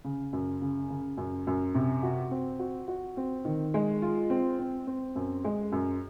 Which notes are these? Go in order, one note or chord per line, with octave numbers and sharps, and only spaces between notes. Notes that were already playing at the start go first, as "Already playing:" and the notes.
C#3
F#2
C#3
C#3
F#2
F#2
C3
F#4
C4
F#4
F#4
C4
D#3
G#3
F4
C4
C4
C4
F#2
G#3
F#2